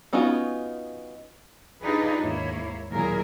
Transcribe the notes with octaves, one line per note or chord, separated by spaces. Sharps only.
B3 C#4 D#4 F4 F#4
D4 D#4 F4 G4 G#4 B4
D#2 G#2 A#3 E4 C#5
D#2 A#2 F#3 E4 G#4 A#4